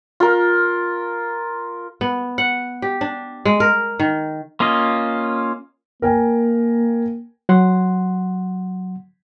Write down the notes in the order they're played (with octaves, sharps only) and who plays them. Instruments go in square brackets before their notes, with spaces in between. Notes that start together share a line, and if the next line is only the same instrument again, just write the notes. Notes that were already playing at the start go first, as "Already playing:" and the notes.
[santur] F4 A#4
[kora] B3
F#5
G4
D4
G#3
A#4
D#3
[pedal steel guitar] A#3 C#4 F4 D#5
[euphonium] A#3 [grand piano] A#4 G5 G#5
[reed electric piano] F#3 F#5 C6